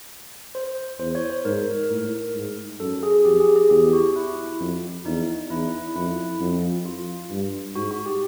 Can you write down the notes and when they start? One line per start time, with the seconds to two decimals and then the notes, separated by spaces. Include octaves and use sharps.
0.55 C5
1.00 E2 C5
1.15 C#5
1.30 C5
1.45 G#2 A#4
1.90 A2 A#4
2.34 G#2
2.80 F#2 A4
3.03 G#4
3.25 F2 G4
3.40 G#4
3.56 G#4
3.70 E2 G4
3.93 F#4
4.16 E4
4.60 F2
5.05 E2 D#4
5.50 E2 E4
5.96 F2 E4
6.41 F2
6.86 F4
7.31 G2
7.76 G#2 F#4
7.91 F#4
8.06 G4